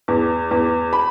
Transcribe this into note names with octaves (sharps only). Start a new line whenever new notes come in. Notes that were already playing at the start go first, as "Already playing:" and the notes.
E2
E2
B5